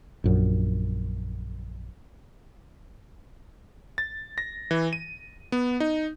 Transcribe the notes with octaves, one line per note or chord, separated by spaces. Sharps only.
A#1 F#2
A6
A#6
E3
D#7
B3
D#4